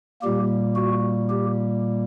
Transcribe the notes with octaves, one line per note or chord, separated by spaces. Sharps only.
A#2 G3 A#3 G4
F#4
G4